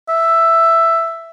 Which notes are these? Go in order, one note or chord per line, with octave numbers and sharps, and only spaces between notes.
E5